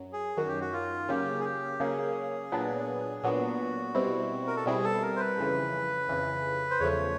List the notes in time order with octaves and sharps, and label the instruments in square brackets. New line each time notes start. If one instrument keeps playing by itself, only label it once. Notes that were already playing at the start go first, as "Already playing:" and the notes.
Already playing: [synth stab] F#2 F#3
[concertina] G#4
[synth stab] F#2 D#3 F#3 [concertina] F#4
[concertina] G4
F#4
F4
[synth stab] C#3 F#3 A#3 C#4 [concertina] G4
[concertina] G#4
G4
[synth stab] C#3 F#3 A#3 C#4 [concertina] G#4
[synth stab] A#2 F#3 B3 D4
[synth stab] A#2 F#3 B3 D4 [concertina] F#4
[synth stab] B2 G3 C4 E4
[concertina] A#4
A4
[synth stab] B2 G3 C4 E4 [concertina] G#4
[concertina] A4
A#4
C5
B4
[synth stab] F2 C#3 E3
F2 C#3 E3
[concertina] C5
[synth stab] E2 C#3 F3 A3 [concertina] C#5